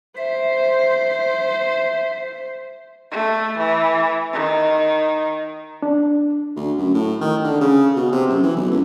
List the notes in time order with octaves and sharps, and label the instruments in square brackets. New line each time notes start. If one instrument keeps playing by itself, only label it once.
[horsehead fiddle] C5 [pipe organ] E5
[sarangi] A3
E3
D#3
[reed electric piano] D4
[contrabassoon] D2
F#2
A2
D#3
D3
C#3
B2
C3
F#2
E3
B1
C#2